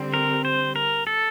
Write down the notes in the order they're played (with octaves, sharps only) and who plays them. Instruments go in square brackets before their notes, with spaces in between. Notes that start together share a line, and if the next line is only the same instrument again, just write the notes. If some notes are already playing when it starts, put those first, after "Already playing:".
Already playing: [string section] D3 G3 C4
[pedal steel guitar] A#4
C5
A#4
A4